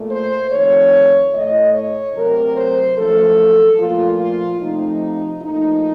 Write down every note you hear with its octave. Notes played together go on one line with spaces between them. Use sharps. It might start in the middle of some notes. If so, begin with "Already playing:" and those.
Already playing: A#2 A3
C5
F2 D#3 A3 C#5
A2 A3 D#5
C#5
C3 F#3 A3 A#4
C5
F#2 F3 A3 A4
A#2 F3 A3 F4
F4
C3 F3 A3 D#4
A#2 F3 A3 D#4